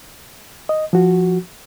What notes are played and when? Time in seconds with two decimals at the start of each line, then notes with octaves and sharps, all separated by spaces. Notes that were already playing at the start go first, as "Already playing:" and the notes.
0.69 D#5
0.93 F3 F#4